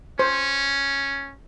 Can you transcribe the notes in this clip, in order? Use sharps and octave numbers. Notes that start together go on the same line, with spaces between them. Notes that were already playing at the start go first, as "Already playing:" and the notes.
C#4 C5